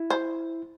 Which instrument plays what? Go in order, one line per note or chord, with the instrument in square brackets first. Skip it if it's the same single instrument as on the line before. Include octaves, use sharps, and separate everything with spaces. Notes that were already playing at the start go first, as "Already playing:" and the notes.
Already playing: [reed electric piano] E4
[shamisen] C5